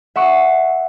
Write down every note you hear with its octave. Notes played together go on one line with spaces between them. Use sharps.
E5 F#5 C#6 D#6 C#7 D7